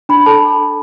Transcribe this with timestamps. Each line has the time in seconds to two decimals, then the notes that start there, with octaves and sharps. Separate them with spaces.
0.09 D4 B5
0.26 A4 A5